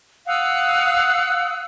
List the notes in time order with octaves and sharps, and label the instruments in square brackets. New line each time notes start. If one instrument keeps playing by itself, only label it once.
[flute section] F5 F#5 D#6 E6